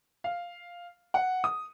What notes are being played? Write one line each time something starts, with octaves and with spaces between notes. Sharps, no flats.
F5
F#5
D#6